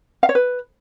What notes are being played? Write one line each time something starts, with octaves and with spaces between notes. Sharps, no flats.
F5
C#5
B4